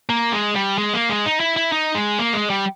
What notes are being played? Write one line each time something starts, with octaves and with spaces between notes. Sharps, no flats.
A#3
G#3
G3
G#3
A#3
G#3
D#4
E4
E4
D#4
G#3
A#3
G#3
G3